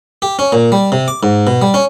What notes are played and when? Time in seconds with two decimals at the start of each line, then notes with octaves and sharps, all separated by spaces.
0.22 G4
0.39 C#4
0.52 A#2
0.72 G3
0.92 C3
1.08 D6
1.23 G#2
1.47 B2
1.62 G3
1.74 C#4